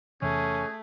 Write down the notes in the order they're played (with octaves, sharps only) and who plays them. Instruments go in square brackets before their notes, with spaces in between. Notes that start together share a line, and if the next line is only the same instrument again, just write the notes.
[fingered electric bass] E2 C3 E3 [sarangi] A3 [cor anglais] C#4 [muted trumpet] G#4